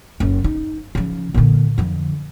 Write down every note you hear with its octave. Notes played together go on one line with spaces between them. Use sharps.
F#1 C#4
D#4
C#3 F3
A#2 D3
F2 D3